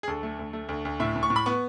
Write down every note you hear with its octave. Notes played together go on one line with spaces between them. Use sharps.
G#4
D2 A4
A3
D2
A3
D2
D2
A2 E5
A2
C#6
A2
B5
B3 C#6